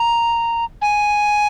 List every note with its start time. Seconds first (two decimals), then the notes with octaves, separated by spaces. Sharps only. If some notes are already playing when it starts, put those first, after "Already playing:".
Already playing: A#5
0.82 G#5